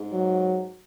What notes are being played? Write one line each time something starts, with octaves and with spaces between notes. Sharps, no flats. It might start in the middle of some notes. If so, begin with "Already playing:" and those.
Already playing: G#2
F#3